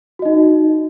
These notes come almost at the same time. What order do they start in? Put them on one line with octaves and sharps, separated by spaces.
F#4 D#5 D#4